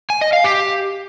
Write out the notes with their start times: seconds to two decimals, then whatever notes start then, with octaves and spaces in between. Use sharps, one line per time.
0.10 G#5
0.21 D#5
0.33 F5
0.44 G4